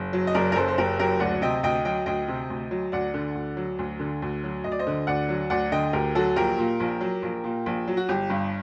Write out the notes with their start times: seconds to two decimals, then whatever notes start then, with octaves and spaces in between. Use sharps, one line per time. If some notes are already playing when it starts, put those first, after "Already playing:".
Already playing: F#1
0.13 F#3
0.27 D#5
0.35 F#1 A#4 D5
0.52 A#4
0.56 F#2 A4 C5
0.68 C5
0.78 F#1 G4 A#4
0.99 F#3 G4 A#4
1.20 D2 D5 F#5
1.42 C3 D#5 G5
1.63 D2 D#5 G5
1.85 F#3 D#5 G5
2.06 D2 D#5 G5
2.28 C3
2.50 D2
2.71 F#3
2.92 D2 D5 F#5
3.14 D3
3.35 D2
3.57 F#3
3.79 D2
3.99 D3
4.22 D2
4.44 F#3
4.64 D2 D#5
4.72 D5
4.79 C5 D#5
4.87 D3
5.07 D2 D5 F#5
5.29 F#3
5.50 D2 D5 F#5
5.72 D3 D#5 G5
5.93 D2 G4 A#4
6.15 F#3 F#4 A4
6.36 A#1 G4 A#4
6.58 A#2
6.80 A#1
7.01 F#3
7.23 A#1
7.44 A#2
7.66 A#1
7.87 F#3
7.97 F#4
8.09 G1 G4
8.30 G2